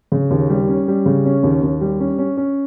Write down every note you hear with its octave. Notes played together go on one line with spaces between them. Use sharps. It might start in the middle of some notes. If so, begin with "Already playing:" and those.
C#3
D#2
G3
C#4
G3
C#3
C#4
D#2
D#2
G3
C#4
C#4
C#4